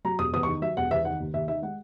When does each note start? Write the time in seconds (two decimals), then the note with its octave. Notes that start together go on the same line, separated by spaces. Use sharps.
0.05 F#3 A#5
0.19 E1 D#6
0.33 E2 D#6
0.43 C#6
0.47 D#3
0.62 F#3 E5
0.77 E1 F#5
0.91 E2 E5
1.05 D#3 F#5
1.20 D#2
1.34 D#2 E5
1.48 D#3 E5
1.62 G#3 F#5